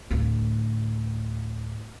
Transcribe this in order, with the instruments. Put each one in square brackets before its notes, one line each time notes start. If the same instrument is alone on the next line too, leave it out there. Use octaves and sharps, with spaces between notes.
[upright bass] D2 A2